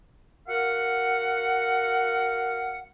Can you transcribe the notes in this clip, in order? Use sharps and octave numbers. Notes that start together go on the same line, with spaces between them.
F#4 A#4 F5 F#5